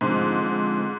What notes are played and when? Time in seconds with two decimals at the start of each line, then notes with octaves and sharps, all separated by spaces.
0.01 G#2 D3 F3 G#3 C4
0.43 D3 F3 G#3 C4